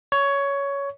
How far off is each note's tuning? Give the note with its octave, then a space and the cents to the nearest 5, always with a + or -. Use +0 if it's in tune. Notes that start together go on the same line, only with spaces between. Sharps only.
C#5 +15